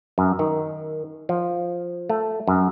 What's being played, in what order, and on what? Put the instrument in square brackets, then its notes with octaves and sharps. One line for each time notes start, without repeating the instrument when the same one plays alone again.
[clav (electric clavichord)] F#2
D#3
F3
A3
F#2